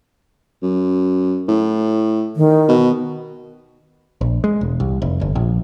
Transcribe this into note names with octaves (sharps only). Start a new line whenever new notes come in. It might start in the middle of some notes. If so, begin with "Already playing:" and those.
F#2
A2
D#3
B2
A#1
G#3
E1
C2
F1
G1
A#1